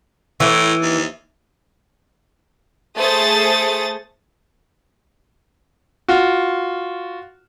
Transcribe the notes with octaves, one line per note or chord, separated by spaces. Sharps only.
A2 E3
D#2
A3 G#4 C5 D#6 A6
F4 F#4